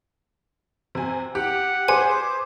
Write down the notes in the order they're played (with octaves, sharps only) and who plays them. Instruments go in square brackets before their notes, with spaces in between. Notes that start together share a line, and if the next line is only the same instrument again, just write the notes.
[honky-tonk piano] C3 G#5
[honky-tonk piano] G4 [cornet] F#5
[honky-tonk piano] G#4 B4 C5 [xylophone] G#5 [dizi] D6